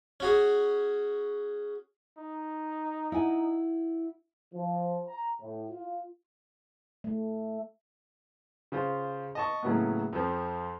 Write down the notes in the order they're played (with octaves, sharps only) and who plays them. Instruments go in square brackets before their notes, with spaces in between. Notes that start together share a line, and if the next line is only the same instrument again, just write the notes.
[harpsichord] C#4 F#4 G#4
[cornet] D#4
[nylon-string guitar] E4 F#5 G#5
[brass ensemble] F3
A#5
A2
F4
[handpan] A3
[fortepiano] C#3 F4 C5
D#5 A5 C#6
A2 C#3 F#3 A#3 B3
F2 F3